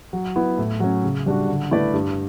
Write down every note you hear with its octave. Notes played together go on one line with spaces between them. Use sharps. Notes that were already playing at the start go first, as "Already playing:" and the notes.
F#3
B3 E4
A2
F#3 C#4
C#3
G3 D4 F#4
D3
A3 E4 B4 D5
G2